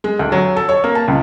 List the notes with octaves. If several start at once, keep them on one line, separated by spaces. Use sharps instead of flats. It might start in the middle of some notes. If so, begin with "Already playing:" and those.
G#3
D2
F#3
A4
C#5
A#3
A5
C#2